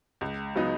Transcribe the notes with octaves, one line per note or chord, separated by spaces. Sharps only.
C#2
C#3 F#3 B3 D#4